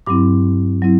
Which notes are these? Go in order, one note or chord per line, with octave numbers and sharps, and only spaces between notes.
G2 F#3 C4 E4 D6
F#3 C4 E4